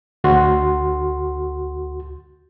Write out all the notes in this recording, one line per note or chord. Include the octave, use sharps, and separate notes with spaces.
D2 F#4 C6